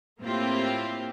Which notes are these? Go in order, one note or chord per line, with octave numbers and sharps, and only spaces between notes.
A2 A#3 C4 E4 F4 G4